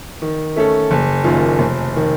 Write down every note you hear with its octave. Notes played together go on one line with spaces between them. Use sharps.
D#3
A3 C#4 A4
F#1
F#2 D#3 A#3 F4
F1
D#3